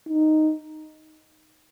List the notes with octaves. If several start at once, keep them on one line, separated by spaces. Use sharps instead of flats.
D#4